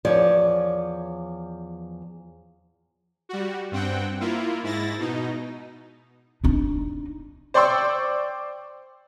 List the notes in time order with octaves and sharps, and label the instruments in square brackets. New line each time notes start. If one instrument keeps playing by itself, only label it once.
[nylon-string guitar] E2 F3 C#5 D5
[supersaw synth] G3 F#4
G2 C4 F#5 G5
A#3 E4 F4
G#2 E4 A6 A#6
B2 D#4
[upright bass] D4 D#4
[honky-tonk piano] C5 D5 G5 C6 C#6 E6